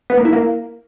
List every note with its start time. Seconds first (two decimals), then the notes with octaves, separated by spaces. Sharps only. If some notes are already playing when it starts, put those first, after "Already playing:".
0.10 B3
0.17 A#3
0.25 E4
0.33 A#3